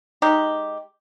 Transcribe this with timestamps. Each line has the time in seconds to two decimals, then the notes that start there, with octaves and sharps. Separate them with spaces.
0.22 G#3 D#4 G4